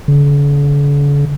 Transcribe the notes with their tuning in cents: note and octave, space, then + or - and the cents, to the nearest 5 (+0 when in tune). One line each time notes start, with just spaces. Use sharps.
D3 -45